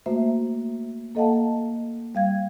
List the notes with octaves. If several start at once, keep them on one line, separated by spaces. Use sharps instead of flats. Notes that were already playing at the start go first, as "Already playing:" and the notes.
A3 A#3 F#4 C5 E5
A#3 A4 D#5 F5 F#5 A5
G3 F5 G#6